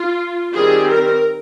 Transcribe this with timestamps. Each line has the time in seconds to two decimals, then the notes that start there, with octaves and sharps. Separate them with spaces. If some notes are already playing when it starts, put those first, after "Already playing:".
Already playing: F4
0.54 D#3 G3 C4 G#4
0.90 A#4